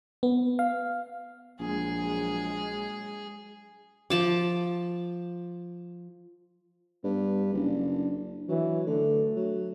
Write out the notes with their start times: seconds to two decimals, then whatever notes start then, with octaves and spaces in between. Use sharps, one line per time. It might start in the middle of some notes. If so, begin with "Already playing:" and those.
0.23 B3
0.59 F5
1.60 A#1 F#3 G#3 G#4
4.10 F3 A5 D6
7.04 G2 B3
7.53 F#1 D4
8.49 E3 F#3
8.87 D3 A3
9.36 F#3